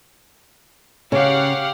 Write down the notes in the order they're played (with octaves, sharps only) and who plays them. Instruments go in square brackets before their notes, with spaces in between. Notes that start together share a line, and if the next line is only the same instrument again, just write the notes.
[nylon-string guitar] C#3 [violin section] G4 F5 F#5